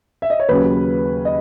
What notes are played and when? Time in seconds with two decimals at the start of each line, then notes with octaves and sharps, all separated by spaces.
0.22 E5
0.30 D#5
0.39 C#5
0.48 D#2 C#3 F#3 C#4 B4
1.25 D#5